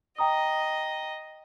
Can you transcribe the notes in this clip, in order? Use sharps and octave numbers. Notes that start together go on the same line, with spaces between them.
D#5 G5 A#5 D#6